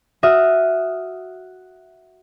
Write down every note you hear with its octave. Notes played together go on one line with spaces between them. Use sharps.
F#4 E5 D#6 F6